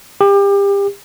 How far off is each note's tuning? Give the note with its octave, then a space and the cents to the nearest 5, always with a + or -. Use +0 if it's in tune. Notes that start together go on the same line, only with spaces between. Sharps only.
G4 +30